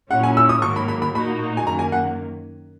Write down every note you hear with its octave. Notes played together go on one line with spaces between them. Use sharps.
A#2 F#3 C#4 E4 F#5
G#5
E6
D#6
G#2 D#3 F#3 A#3 C#6
B5
B5
B5
A#2 A#3 D#4 F#4 B5
G#5
F#2 D#3 A#3 A#5
G#5
F#5